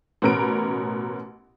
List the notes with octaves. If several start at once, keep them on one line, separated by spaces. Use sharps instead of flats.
A1 B2 C#4 A#4 B5 D7